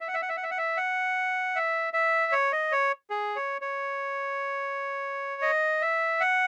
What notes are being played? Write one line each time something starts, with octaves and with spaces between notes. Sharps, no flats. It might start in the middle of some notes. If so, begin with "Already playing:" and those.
E5
F#5
E5
F#5
E5
F#5
E5
F#5
E5
F#5
E5
E5
C#5
D#5
C#5
G#4
C#5
C#5
D#5
E5
F#5